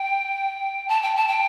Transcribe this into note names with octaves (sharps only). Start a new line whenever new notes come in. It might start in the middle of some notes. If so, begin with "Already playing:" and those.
Already playing: G5
A5
G5
A5
G5